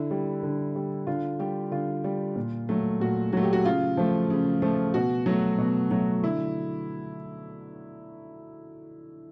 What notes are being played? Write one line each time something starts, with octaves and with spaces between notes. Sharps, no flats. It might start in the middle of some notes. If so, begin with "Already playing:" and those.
Already playing: D3 E4
G3
D3
G3
D3 F4
G3 G4
D3 F4
G3
A#2
F#3 A3
A#2 F#4
F#3 A3 F#4
G4
F#4
C#3 F4
F3 A3
C#3
F3 A3
B2 F#4
F#3 A3
B2
F#3 A3
D3 E4